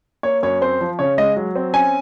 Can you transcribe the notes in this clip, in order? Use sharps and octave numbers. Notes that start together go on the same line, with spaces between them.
A#3 C#5
F#2 C#5
C4 C5
F3
C#3 C#5
G#3 D#5
F#3
C4
C#4 G#5